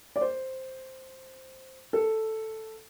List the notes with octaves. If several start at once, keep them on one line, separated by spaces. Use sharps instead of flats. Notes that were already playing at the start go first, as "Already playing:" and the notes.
D5
C5
A4